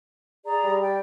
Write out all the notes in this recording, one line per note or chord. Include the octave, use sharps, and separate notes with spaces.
G#4 D5 A#5
G3
D5 G5